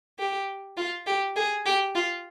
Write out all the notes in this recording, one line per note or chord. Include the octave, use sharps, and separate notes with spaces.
G4
F4
G4
G#4
G4
F4